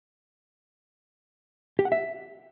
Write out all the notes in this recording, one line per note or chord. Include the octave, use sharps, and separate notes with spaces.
G4
F#5
E5